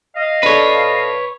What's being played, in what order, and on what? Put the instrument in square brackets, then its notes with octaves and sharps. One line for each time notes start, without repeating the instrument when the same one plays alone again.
[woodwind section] D#5 F5
[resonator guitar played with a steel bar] D4 A4 [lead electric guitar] B4 C#5